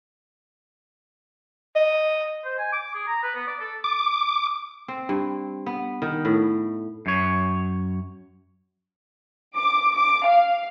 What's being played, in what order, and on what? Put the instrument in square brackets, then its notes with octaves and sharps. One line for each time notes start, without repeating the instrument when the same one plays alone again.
[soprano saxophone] D#5
[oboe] C5
G#5
D6
G#4
A#5
B4
B3
D5
A4
[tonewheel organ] D6
[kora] C4
G2
B3
D#3
A2
[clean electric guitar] F#2 C#5
[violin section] D6
D6
F5